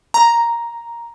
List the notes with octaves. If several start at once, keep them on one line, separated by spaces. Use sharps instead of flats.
A#5